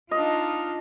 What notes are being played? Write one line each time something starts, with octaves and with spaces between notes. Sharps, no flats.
D4 D#4 F4 D#5 F6